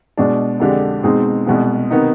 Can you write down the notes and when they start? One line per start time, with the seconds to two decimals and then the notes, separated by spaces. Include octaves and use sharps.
0.17 B2 G#3 D4
0.60 F2 D3 G#3 D4 G4
1.03 B2 G#3 C4 D#4 G#4
1.47 C2 B2 G#3 B3
1.90 C3 D#3 B3 D#4